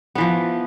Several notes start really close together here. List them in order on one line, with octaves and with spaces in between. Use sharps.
B3 E3 F3